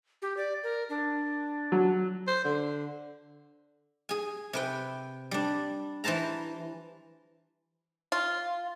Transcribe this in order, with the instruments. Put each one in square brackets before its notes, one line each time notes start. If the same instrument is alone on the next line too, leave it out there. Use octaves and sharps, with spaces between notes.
[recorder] G4
D5
A#4
D4
[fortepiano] F#3
[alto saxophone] C5
D3
[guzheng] G#4 G#5
C3 B4 G5
G3 D4
E3 B4 C5 A5 A#5
[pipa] F4